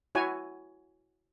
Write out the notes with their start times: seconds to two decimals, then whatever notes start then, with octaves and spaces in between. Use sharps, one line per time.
0.15 E4 F#4 C#5 G#5